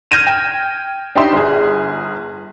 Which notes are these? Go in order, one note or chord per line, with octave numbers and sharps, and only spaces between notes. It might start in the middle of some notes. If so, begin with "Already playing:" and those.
F6 G6 G#6 A#6 D#7 E7
G5
D4 D#4 G4 D#5 E5 C6
G1 G#4